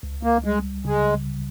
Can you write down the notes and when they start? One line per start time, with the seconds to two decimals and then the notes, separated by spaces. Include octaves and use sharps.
0.03 C#2
0.23 A#3
0.44 G3 G#3
0.84 C#3 G#3